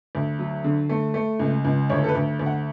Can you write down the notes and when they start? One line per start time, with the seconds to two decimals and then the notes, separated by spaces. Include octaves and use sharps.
0.15 D2
0.39 F#3
0.64 D3
0.89 A3
1.14 A3
1.39 C#2
1.65 C#2
1.90 D2 C#5
2.04 A4
2.09 B4
2.15 D2
2.39 D2
2.46 F#5